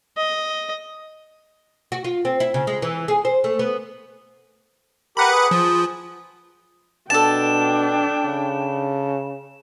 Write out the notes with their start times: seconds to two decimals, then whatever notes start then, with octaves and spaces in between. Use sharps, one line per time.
0.17 D#5
1.92 F#4
2.04 F4
2.25 C4
2.40 E4
2.54 C#3
2.67 G#3
2.82 E3
3.08 G#4
3.25 C5
3.44 A3
3.59 B3
5.17 G4 A#4 B4 F#5 B5
5.31 G#4
5.51 F3
7.10 B2 D4 A4 G5 A5 E7
8.25 C#3